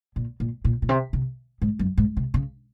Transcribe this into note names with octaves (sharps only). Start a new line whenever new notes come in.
A#2
A#2
A#2
A#2
C3
C3
G#2
F#2
G#2
C3
C#3